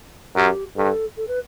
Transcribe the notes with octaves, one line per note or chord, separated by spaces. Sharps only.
F#2 G4
G2 A4
A4
B4